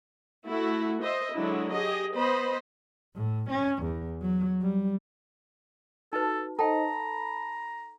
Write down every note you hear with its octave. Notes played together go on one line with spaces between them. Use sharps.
A3 E4 F#4
C5 D#5 E5
D3 F#3 G#3 D4 E4
G4 G#4 D#5
B3 C5 D#5 B5
A2
C#4
E2
F#3
G3
D#4 F#4 A4 B4 A5
D#4 A4 C5 D#5 G5 A5 A#5
B5